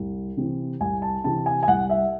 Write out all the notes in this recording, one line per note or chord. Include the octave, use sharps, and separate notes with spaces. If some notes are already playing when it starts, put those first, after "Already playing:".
Already playing: C2
C3 E3 C4
C2 G#5
A5
C3 E3 C4 A5
G#5
G#5
C2 F#5
E5